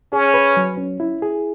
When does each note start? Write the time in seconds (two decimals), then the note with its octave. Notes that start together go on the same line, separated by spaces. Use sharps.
0.13 C#4 G#4
0.34 B4
0.57 F#3
0.77 C#4
1.00 E4
1.22 G#4